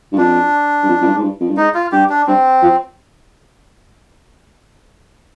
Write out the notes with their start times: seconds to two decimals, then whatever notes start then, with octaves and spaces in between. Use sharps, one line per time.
0.12 G2
0.18 F2 D4
0.83 G2
0.88 F2
1.01 F2
1.06 G2
1.17 G#2
1.22 G2
1.40 F2
1.49 G2
1.57 G#2 D#4
1.75 F4
1.92 G2 G4
2.10 D4
2.27 G2 C4
2.62 F3